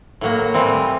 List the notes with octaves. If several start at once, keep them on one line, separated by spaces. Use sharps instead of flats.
A2 F#3 A#3
A2 E3 G3 C4